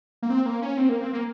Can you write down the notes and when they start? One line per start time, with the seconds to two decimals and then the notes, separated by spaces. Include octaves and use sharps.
0.23 A#3
0.30 C4
0.46 A#3
0.62 C#4
0.77 C4
0.89 A#3
1.01 C4
1.13 A#3